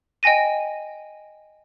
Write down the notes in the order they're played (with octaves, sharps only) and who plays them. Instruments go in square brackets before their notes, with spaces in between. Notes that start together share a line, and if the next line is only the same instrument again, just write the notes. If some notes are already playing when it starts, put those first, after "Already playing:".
[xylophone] D#5 G5 G#5 A#6 D#7